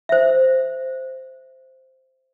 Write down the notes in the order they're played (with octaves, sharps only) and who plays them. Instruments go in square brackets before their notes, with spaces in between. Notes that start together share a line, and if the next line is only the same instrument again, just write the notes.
[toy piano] C5 E5